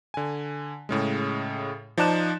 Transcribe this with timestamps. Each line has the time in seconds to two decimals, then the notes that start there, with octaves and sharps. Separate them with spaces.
0.14 D3 G#5
0.89 A2 C#3 G#3
1.97 F3 D#4 D5 A5 F#6 E7